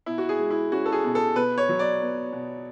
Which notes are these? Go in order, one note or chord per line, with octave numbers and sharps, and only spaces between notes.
B2 E4
F#4
G#4
G#3
E4
C#4 F#4
A4
G#4
B2
A4
B2 B4
C#5
F#3
D5
B3
B2